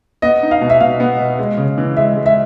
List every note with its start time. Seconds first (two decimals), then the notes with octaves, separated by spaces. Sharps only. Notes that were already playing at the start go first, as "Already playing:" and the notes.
0.22 B3 D#5
0.43 D#4
0.51 F5
0.61 B2
0.70 E5
0.80 B2 F5
1.00 B3
1.20 B2
1.39 G#3
1.58 C#3
1.78 E3
1.97 G#3 E5
2.16 G#3
2.26 E5